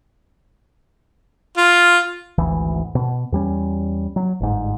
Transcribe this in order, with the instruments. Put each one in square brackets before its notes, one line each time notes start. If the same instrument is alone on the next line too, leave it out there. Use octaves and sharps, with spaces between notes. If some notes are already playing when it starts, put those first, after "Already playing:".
[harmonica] F4
[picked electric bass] G#1 D2 E3
B2
E2 G3 C#4
F#3
G1 G#2